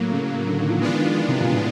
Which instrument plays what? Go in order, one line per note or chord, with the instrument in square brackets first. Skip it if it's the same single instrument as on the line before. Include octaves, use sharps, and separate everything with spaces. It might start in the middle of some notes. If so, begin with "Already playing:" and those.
Already playing: [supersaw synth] A2 F#3 A#3
[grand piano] C#3
D3
D#3
F3
[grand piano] E3 [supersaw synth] G#3 B3 D4 F4
[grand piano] D#3
F3
E3
C3
A#2
A2